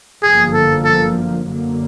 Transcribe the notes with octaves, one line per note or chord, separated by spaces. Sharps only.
G1 F#2 D3 F3 A#3 G#4
A4
A4
F#2 D3 F#3 A#3